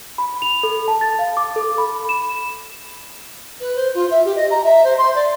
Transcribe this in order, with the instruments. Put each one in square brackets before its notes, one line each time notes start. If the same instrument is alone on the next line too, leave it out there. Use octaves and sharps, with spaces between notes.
[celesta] B5
F7
A4
A5
A6
F5
D6
A4
B5
E7
[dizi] B4
C5
F4
E5
G4
D#5
A#5
E5
C5
C6
D5